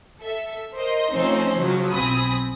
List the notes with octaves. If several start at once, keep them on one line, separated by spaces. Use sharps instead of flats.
A4 E5
A#4 C5 D#5
F3 A3 C4 C#4 D#4 C5
C#3 F3 F#3
B1 C4 G#5 B5 D#6